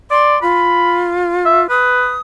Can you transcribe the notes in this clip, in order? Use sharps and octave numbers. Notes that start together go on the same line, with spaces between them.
D5 C6
F4 B5
E5
B4 D#6